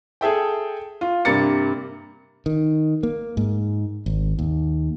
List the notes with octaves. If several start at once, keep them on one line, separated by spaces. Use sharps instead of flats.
G#4 A4 E5 G5
F4
G2 C3 A#3 A6 C#7
D#3
A#3
G#2
G#1
D#2